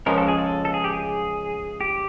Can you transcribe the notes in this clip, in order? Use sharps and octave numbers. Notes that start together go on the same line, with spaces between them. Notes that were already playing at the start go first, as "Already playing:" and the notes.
C#2 C#3 F3 G#3 C#4 A#4
A4
G#4
A4
A4
G#4
G4
G#4
G4